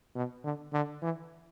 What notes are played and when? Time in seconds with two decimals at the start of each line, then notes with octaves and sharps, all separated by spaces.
0.15 B2
0.44 D3
0.73 D3
1.02 E3